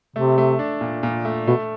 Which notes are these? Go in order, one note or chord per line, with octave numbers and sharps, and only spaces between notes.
C3 A3
A3
D4
A#2
A#2
A3
B2 A3